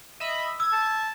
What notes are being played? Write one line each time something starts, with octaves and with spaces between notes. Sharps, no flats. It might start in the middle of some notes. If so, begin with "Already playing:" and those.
D#5 E5 B5
E6 G#6
A5